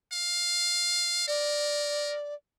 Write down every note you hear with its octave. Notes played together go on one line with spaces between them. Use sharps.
F5
A#4 D5